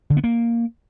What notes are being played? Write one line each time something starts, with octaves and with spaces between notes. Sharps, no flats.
D3
B3
A#3